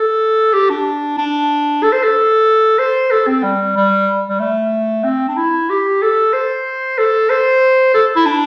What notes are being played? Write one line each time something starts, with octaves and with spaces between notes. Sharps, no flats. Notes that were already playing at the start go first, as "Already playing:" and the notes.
Already playing: A4
G4
D4
D4
A4
C5
A4
C5
A4
C4
G3
G3
G3
A3
C4
D4
E4
G4
A4
C5
A4
C5
A4
E4
D4